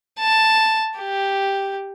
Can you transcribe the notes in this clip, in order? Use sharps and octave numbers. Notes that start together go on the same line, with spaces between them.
A5
G4